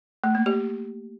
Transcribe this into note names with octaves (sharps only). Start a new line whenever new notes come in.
A3
A#3
G4